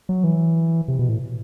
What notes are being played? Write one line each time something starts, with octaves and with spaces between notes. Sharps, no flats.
F#3
E3
C3
B2
A2